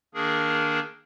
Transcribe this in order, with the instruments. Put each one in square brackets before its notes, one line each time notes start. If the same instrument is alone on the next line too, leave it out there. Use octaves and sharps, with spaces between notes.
[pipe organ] D#3 A#3 D4 G#4 A#4